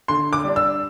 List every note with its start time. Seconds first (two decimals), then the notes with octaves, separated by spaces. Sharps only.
0.08 D3 C6
0.33 D6
0.44 G3 D4
0.56 E6